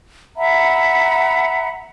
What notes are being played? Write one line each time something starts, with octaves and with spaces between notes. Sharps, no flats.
E5 F#5 A#5 B5